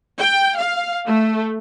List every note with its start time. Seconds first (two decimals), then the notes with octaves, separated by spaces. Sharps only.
0.20 G5
0.58 F5
1.05 A3